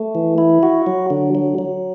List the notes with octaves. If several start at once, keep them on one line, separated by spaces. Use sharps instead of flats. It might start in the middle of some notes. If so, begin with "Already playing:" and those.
Already playing: A3
E3
E4
F#4
F#3
D3
F#3
F#3